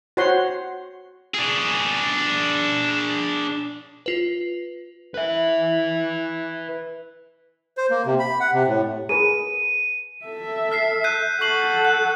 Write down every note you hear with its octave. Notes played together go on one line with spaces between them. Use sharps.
F#4 C5 C#5 F#5 C6
D4 G#4
F4 B4
B4 E5
C5
A#3
C3
B5
F#5
C3
A2
G#4 A#4 B4 D#7
A4 E5
F6 B6 C7
F#6 G6 D#7
A4 F#5 C#6 C7 F#7
F#6 F#7